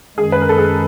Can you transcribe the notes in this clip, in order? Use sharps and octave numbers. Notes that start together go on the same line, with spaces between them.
F#2 D#3 G#3 G#4
B4
A#4
A4
G#4